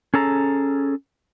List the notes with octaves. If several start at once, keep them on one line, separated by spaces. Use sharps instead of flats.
C#4 G#4 A4 A#5